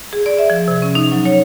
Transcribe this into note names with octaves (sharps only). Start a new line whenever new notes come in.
G#4
D5
E5
F3
C3
C#4
D#4
F#3
C#5